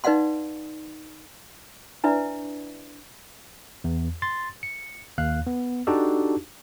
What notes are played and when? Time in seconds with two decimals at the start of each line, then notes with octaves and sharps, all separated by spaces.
0.04 D#4 B4 D5 F5 F#5 C6
2.04 D4 E4 B4 D5 E5
3.84 E2
4.22 C6 A6
4.63 C#7
5.18 D#2 F5 F#6
5.47 B3
5.87 D4 D#4 F#4 G4 A4